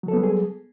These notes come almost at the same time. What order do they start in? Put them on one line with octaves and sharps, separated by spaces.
F#3 A4 B3 G3 G#4